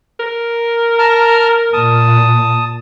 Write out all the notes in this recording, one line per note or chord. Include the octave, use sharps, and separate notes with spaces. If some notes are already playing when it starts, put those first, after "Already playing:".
A#4
A5 A#5 F6
A#2 A5 D#6